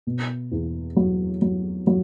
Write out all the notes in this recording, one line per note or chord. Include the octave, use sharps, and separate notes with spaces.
B2
E2
F#3
F#3
F#3